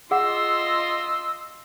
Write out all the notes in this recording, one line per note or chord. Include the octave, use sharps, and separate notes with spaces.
F4 G#4 D#5 F#5 C6 E6